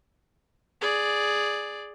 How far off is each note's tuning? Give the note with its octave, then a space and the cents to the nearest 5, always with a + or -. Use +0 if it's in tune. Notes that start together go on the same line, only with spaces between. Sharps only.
G#4 +0 D5 +0